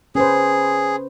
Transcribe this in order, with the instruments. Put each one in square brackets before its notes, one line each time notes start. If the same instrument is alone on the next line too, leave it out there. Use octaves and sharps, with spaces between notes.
[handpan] C#4 B4 C5 [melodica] G#4